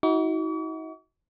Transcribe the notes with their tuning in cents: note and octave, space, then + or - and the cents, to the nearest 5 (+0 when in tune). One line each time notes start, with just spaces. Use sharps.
D#4 +45 F#4 +0 C#6 +45